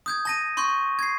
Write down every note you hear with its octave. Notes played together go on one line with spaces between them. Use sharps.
D#6 G6 G#6
A5 A#6 D#7
C6 C#6 G6
G#6 C7